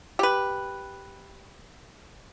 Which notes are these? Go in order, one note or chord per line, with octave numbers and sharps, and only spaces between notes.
G4 B4